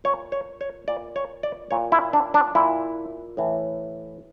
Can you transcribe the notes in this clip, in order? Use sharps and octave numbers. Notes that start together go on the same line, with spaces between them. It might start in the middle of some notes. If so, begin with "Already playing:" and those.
A#2 C#5
C#5
C#5
A#2 D5
C#5
D5
A#2 C#5
E4
D4
D4
A#2 E4
A2 E3